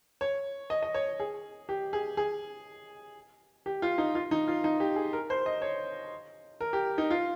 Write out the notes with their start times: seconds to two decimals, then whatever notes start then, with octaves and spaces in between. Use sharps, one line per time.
0.21 C#5
0.70 D#5
0.83 D#5
0.94 C#5
1.20 G#4
1.69 G4
1.93 G#4
2.17 G#4
3.66 G4
3.82 F4
3.98 D#4
4.15 F4
4.31 D#4
4.48 F4
4.64 D#4
4.80 G4
4.96 G#4
5.13 A#4
5.30 C5
5.46 D#5
5.62 C#5
6.61 A#4
6.73 G4
6.98 D#4
7.10 F4